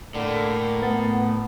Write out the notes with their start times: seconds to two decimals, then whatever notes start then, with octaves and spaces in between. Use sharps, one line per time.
0.15 A2 D3 A#3 A#4
0.82 A3 B3 F#5 A6